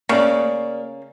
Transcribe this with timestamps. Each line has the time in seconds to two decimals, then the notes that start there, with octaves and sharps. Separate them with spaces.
0.09 C#3 A#3 D5